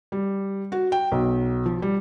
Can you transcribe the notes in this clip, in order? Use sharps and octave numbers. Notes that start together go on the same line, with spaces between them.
G3
F#4
G5
B1
F3
G3